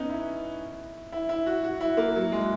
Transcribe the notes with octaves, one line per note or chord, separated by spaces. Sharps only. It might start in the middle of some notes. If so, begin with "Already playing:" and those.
Already playing: B3 C#4 D#4
E4
E4
E4
F#4
F#4
E4
A#3
F#3
G#3